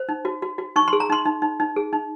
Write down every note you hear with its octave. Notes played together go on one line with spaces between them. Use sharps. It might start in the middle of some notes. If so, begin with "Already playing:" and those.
Already playing: C5
D#4
F#4
F#4
F#4
D#4 C#6
C6
G#4
A#5
D#4 C6
D#4
D#4
D#4
G#4
D#4